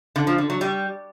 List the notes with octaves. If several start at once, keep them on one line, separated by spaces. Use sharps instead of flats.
D3
F3
D3
F#3
G3